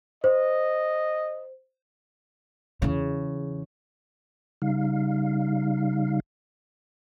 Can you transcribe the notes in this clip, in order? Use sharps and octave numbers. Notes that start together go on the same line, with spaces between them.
C5 D#5
E2 C#3
C#3 G3 D#4 F5